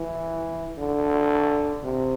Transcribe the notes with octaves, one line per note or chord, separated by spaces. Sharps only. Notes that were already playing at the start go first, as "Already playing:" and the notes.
Already playing: E3
D3
C3